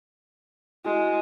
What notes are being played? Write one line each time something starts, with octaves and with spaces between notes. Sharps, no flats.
G#3 E4 F#4